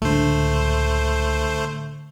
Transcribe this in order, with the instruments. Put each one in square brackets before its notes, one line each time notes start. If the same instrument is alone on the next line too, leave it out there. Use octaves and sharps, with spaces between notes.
[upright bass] C#2 [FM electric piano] A2 D3 [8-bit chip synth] A3 C5